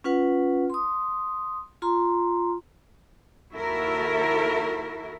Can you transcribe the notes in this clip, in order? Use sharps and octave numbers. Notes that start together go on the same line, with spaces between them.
C#4 F4 B4 F#5
C6 D#6
F4 A#5 C6
D#2 E4 F#4 A4 A#4 E5